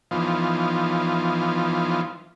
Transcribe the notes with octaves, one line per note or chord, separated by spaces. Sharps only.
E3 F3 B3 D#4 F4 C5